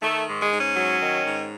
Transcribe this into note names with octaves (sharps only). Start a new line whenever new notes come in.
D#3 A3
G#2
G#3
G#2
C#4
F#3
D#3
G#2